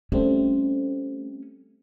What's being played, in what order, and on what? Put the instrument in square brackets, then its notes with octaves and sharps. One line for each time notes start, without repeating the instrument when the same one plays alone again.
[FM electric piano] G3 A3 C4 [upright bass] C#4